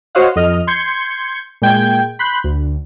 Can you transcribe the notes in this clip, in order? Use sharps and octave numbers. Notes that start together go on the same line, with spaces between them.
F#4 C5 C#5 D#5 F5 F#5
F2 D#5 F6
C6 G6 G#6 C#7
A#2 G#3 G5 G#6
B5 C6 F#6 G6
D2